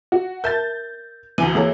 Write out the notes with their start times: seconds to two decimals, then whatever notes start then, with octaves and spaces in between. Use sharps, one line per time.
0.12 F#4
0.44 A#4 E5 A5 G6 A6
1.38 D2 E3 G#5 D#7
1.55 E3 A#3 G#4 A4 C#5